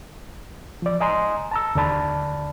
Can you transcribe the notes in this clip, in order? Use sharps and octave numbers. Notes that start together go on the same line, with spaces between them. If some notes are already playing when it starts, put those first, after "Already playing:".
F3 D5
D#5 G#5 A#5 C6
A5 A#5 E6
D#2 D3 D5 A5 B5